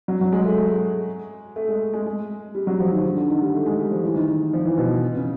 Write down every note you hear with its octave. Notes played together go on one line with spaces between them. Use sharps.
F#3
F#3
G#3
A3
G#3
A3
G#3
G#3
G#3
G3
F#3
F3
D#3
D3
D3
D#3
G3
A3
G#3
G3
F3
E3
D#3
D#3
F3
E3
B2
C#3